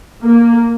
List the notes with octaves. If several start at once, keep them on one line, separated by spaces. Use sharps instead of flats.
A#3